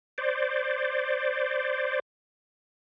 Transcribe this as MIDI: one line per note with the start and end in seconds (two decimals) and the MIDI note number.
0.18 2.00 72
0.18 2.00 74